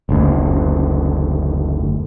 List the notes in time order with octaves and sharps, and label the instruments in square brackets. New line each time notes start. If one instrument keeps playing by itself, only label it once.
[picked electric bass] F#1 D2